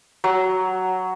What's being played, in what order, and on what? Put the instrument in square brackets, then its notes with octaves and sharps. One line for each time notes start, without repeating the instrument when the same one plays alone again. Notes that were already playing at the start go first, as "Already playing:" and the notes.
[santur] F#3